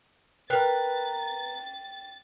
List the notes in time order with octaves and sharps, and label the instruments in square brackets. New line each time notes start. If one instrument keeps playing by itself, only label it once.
[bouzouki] A#4 B4 [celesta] G5 [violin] A6